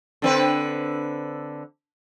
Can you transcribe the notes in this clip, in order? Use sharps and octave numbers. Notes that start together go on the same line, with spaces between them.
D3 C4 B4